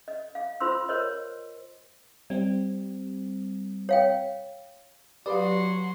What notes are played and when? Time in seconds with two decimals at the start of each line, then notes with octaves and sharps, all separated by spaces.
0.08 D#5
0.35 F5
0.60 F4 C5 B5 C6 E6
0.89 A#4 C5 C#5 D#5
2.30 G3 C4 D5
3.89 C#5 F5 G5
5.26 F#3 F#4 G4 B4 D5 F5 C6